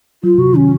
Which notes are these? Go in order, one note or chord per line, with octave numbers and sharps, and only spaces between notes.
F#3 F4
C3 F#4
D#3 C#4